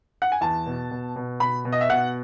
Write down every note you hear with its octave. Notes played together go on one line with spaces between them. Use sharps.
F#5
G#5
E2 A5
B2
B2
B2
B2 B5
B2
D#5
E5
B2 F#5